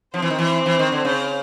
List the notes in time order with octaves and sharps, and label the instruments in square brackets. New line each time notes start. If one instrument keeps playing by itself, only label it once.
[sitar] F3 [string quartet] C4 C5
[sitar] E3
D#3
E3
E3
D#3
D3
C#3